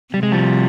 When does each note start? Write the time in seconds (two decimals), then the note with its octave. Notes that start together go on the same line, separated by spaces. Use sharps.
0.14 C3 G3
0.23 G#3
0.32 F3 G3